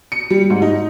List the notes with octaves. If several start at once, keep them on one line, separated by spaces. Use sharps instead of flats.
C#7
G3
G#2
D#4